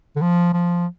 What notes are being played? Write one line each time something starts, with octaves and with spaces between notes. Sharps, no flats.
D3
F3
F3